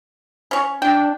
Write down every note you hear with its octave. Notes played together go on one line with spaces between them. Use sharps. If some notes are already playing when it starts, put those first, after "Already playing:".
C#4 C#5
D4 G5